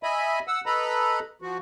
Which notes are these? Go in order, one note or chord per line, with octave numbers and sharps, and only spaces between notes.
D#5 E5 G#5 B5
F#5 E6
A4 B4 D#5 A#5 B5
F3 F#4